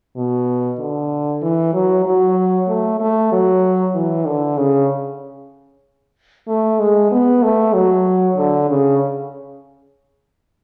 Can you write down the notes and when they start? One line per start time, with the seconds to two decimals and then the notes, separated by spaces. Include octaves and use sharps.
0.16 B2
0.79 D3
1.43 E3
1.74 F#3
2.06 F#3
2.68 A3
3.00 A3
3.32 F#3
3.95 E3
4.27 D3
4.58 C#3
6.48 A3
6.80 G#3
7.12 B3
7.43 A3
7.74 F#3
8.37 D3
8.70 C#3